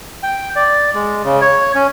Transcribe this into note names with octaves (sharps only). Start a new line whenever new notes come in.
G5
D5
G#3
C#3
C#5
C#4